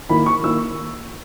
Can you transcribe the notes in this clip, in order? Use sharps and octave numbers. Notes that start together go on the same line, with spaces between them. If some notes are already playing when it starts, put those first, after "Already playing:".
D#3 A#3 E4 B5
C#6
D#3 A#3 E4 E6